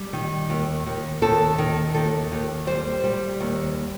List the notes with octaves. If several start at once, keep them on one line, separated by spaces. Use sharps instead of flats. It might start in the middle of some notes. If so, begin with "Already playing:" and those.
Already playing: G3
D#3
D#2
D#2
D#2 A4
D#3
D#2 A4
D#2
G3 C5
G3
D#2